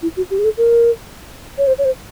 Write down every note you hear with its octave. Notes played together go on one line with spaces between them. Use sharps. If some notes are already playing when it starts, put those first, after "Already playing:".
E4
F#4
G4
G#4
A4
A#4
C#5
C5
C#5
C5